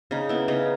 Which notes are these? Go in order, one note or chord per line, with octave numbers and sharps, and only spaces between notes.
C#3 D#4
B3 E4
C#3 D#4